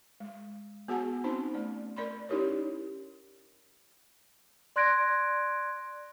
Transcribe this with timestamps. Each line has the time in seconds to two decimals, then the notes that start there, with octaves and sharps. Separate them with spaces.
0.20 G#3
0.88 B3 F#4 G#4 F#5 G#5 A5
1.24 C4 C#4 D#4 C5 A5 C6
1.54 A3 D5
1.96 A#4 D5 B5 C6
2.29 C#4 D#4 E4 G4 A#4 C#5
4.76 D5 C6 F#6 G#6 A#6 D7